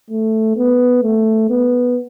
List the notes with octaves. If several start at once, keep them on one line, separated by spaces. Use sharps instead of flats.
A3
B3
A3
B3